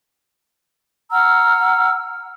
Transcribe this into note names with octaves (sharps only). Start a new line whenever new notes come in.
F#5 A#5 E6 F6